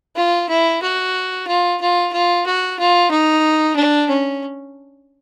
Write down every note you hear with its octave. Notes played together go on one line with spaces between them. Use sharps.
F4
E4
F#4
F4
F4
F4
F#4
F4
D#4
D4
C#4